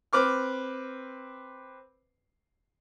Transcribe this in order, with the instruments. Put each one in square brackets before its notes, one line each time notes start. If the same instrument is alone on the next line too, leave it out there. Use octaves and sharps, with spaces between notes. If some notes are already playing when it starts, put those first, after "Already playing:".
[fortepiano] C4 B4 D6 F6